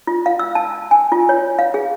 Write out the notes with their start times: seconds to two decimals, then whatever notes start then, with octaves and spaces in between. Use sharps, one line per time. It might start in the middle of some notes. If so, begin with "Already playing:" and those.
0.07 F4
0.26 F5
0.39 E6
0.55 A5
0.91 G#5
1.12 F4
1.29 C#5
1.59 F5
1.74 G#4